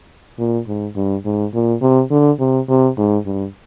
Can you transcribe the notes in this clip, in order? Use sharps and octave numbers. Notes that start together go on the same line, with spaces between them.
A#2
G#2
G2
G#2
A#2
C3
D3
C3
C3
G#2
G2